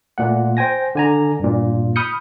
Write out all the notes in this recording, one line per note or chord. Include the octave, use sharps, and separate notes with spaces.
A#2 A3 F#5
C5 G5 G#5 A#6
D3 G#5 A#5
G2 A#2
B5 D#6 F6 G6 C#7